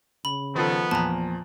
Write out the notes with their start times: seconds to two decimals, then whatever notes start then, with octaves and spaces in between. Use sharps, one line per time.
0.25 C#3 B5
0.55 D#3 F3 B3 A4
0.91 E2 A#2 F3 A5 A#5